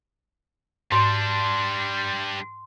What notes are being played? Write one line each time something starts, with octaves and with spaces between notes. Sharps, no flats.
G#2 G3 D4 C6